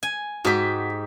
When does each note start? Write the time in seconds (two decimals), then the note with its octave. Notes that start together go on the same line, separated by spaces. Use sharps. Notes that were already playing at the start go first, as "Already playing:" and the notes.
0.03 G#5
0.45 G#2 F#4 G4 B6